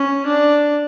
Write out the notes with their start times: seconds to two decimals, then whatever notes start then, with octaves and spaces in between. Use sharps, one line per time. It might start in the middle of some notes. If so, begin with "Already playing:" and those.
Already playing: C#4
0.26 D4